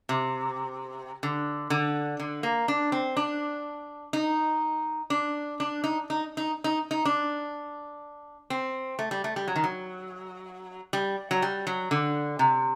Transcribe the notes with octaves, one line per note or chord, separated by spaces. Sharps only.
C3
D3
D3
D3
A#3
D4
C4
D4
D#4
D4
D4
D#4
D#4
D#4
D#4
D#4
D4
C4
A3
G3
A3
G3
F#3
D#3
F#3
G3
F#3
G3
F#3
D3
C3